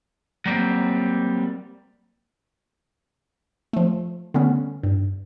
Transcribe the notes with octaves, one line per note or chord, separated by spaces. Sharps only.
F#3 G3 A#3 C4
F3 A3
D3 G3 A3 B3 C#4
G2